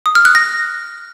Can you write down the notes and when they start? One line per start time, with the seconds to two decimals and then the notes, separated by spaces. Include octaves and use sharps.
0.06 D#6
0.15 F6
0.25 F#6
0.35 A#6